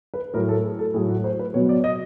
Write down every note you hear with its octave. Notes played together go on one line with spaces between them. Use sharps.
B4
A2 F#3 A#4
A4
G#4
A4
A2 F#3 G#4
F#4
C5
B4
B2 F#3 C#5
D5
D#5